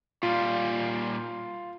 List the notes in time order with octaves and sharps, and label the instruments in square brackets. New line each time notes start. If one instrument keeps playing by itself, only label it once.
[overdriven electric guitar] A#2 G3 [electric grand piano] F4